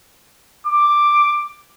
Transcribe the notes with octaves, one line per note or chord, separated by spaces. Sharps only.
D6